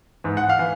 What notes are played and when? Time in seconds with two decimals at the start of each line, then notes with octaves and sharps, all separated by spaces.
0.24 G#2 E3
0.37 F#5
0.49 F5
0.59 E3